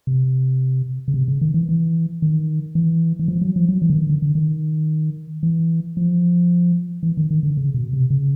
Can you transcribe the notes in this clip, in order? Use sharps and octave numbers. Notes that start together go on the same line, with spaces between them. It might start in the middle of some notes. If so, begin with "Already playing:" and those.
C3
C#3
C3
C#3
D#3
E3
E3
D#3
E3
E3
F3
F#3
F3
F#3
E3
D3
D#3
D3
D3
D#3
E3
F3
E3
D#3
D#3
D3
C#3
B2
C3
C#3